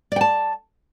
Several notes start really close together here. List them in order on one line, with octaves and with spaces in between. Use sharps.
D5 G5 A5